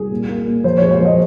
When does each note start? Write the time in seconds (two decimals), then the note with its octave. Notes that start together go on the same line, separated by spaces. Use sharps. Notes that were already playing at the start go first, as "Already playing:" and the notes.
Already playing: C2 G#4
0.11 A#2
0.29 A#3
0.47 A#2
0.64 F3 C5
0.77 G#3 C#5
0.91 C5
0.99 F3
1.05 D#5